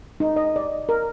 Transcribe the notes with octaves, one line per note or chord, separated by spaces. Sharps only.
D#4
D#5
D5
A#4